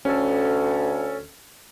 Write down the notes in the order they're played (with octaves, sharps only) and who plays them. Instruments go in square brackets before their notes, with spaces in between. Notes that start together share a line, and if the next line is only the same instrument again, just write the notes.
[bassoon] D2 [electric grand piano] C#4 A4